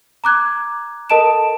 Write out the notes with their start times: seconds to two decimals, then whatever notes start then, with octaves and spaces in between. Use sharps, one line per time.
0.24 A#5 D6 F#6 G#6
1.10 A4 A#4 D#5 A5 D7 E7